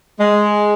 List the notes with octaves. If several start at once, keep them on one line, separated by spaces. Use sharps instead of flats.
G#3